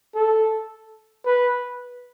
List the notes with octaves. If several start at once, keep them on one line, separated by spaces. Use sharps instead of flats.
A4
B4